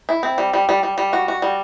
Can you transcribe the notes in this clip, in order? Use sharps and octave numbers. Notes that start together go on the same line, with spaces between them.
E4
C4
G3
G3
G3
G3
G3
F#4
F#4
G3